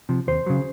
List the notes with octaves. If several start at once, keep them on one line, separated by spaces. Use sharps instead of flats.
C3 F3
D#2 C5
C#3 F#3